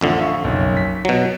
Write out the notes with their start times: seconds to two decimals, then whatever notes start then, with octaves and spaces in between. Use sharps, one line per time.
0.01 A1 F2 D3 E5
0.18 E5 F5 C#6
0.44 F#1 B1
0.77 B6
1.05 B2 F#3